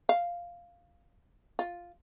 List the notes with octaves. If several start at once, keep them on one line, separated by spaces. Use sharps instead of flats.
F5
F4